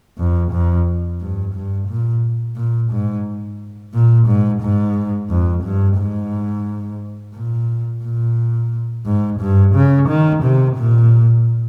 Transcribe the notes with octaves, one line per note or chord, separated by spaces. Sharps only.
F2
F2
G2
G2
A#2
A#2
G#2
A#2
G#2
G#2
F2
G2
G#2
A#2
A#2
G#2
G2
C#3
D#3
C3
A#2